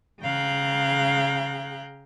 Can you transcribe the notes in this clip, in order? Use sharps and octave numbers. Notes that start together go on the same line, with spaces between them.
C#3 G#4 F5 G5 A#5 F#6